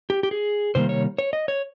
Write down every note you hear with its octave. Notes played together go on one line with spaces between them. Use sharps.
G4
G4
G#4
C3 D#3 G3 A#3 C5
C#5
C#5
D#5
C#5